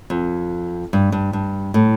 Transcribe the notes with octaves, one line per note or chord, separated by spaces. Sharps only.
F2
G2
G2
G2
A2